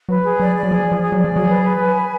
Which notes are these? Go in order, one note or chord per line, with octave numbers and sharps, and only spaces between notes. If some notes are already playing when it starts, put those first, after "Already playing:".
F#3 B4
G#4
F#3 D5
D5
F#3
F3 G#4
D5
F3
G#4
F#3
D5
F3
F#3 G#4
B4
B4
G#5
B4